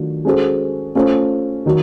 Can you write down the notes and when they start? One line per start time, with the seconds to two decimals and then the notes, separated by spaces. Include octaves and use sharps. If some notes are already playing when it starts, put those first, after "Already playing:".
Already playing: D#3 F#3 A3 D4 F4
0.25 G#3 C#4 F#4 A4 C5
0.95 A3 C#4 F4 A4 C5
1.66 D#3 F#3